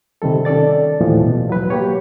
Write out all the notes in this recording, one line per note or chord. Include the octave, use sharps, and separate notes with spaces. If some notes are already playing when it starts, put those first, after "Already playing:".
C3 D#3 G3 A4
D#3 C#4 A4 D5 A6
D#2 A2 E3 F3
B2
F#3 B4
A#3 G4 C#5